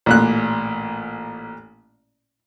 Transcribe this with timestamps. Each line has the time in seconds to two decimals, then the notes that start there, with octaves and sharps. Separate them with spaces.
0.06 A1 A#2 F#6